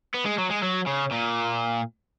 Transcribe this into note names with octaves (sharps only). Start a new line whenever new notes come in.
B3
G#3
F#3
G#3
F#3
C#3
A#2